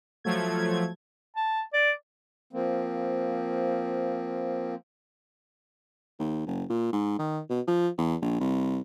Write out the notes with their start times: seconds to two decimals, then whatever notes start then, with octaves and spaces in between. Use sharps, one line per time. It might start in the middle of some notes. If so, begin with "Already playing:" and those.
0.24 F3 F#3 A3 G#6
1.36 A5
1.74 D5
2.53 F3 A#3 C4
6.19 D#2
6.47 F#1
6.69 A#2
6.93 G#2
7.19 D#3
7.50 B2
7.67 F3
7.98 E2
8.22 A#1
8.40 C2